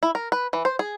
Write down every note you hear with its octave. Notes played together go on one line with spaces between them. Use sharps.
E4
A#4
B4
E3
C5
G#4